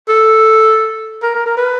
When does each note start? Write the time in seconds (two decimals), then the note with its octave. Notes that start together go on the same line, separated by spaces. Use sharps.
0.08 A4
1.23 A#4
1.35 A#4
1.46 A#4
1.57 B4